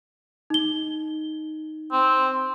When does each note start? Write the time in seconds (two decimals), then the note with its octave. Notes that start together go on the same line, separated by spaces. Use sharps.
0.50 D#4 G7
1.92 C4